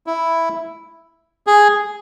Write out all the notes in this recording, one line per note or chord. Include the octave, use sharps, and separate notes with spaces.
E4
G#4